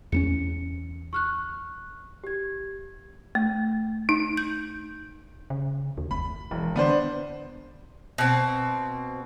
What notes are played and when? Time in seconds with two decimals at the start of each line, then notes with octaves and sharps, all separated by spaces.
0.12 E2 A#3 C#4 C#7
1.13 C#6 F6 F#6
2.24 G4 G#6
3.35 A3
4.09 D#4
4.37 G6
5.50 C#3
5.98 D#2
6.11 F#1 B5
6.51 E1 E3
6.76 D3 B3 D4 C5
8.18 B2 C4